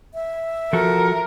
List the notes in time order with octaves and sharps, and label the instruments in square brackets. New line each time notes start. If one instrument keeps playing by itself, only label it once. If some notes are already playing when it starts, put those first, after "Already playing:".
[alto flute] E5
[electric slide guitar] F3 F#4 A4 [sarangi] A#4